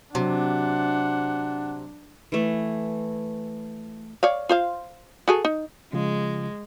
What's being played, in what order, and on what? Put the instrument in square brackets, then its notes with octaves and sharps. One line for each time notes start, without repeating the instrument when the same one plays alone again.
[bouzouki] C3 [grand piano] F#3 [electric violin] D4 [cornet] F#5
[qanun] E3 A3
[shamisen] C#5 D5 F5
F4 C5 F5
F#4 G#4 A4
D#4
[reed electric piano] C#3 F3 F4 [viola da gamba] G#3